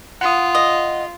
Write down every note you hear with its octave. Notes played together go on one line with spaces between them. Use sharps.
F4 F#5 D#6
D#5